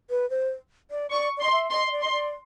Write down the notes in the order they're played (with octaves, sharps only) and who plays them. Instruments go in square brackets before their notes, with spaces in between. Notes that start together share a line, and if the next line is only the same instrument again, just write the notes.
[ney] B4
C5
D5
[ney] D5 [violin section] C#6
[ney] D5
[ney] D#5 [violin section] C6
[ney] E5
[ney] D#5 [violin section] C6
[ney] D#5
D5
[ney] D#5 [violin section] C6
[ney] D5